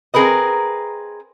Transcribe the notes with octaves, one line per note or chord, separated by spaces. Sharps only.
C4 G#4 A#4 B4 D#5